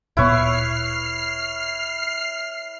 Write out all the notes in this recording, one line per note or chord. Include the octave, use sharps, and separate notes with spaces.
D1 A#2 B3 E4 B4 C#5 F6 C7